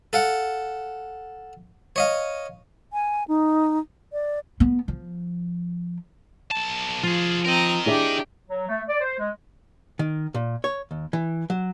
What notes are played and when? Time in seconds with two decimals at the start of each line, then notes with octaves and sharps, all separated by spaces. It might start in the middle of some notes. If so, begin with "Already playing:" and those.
0.13 A4 F5 F#5
1.96 C#5 D#5 F5
2.93 G#5
3.28 D#4
4.13 D5
4.60 B3
4.88 F3
6.51 B1 A5
7.03 F3 F4 G#4
7.46 C4 A#4 D#5 A#5
7.86 D4 E4 G4 G#4 E5
8.48 F#3
8.68 A3
8.88 D5
9.01 C5
9.19 G#3
9.99 D#3
10.34 A#2
10.64 C#5
10.91 D#2
11.13 E3
11.50 F#3